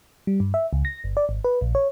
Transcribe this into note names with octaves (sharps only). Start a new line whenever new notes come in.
G3
G2
E5
C#2
A#6
G1
D5
G#1
B4
A#1
C#5